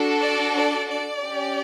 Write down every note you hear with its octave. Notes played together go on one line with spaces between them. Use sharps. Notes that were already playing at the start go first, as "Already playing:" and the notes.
Already playing: D4 F#4 A4
D5
D5
D5
C#4 G4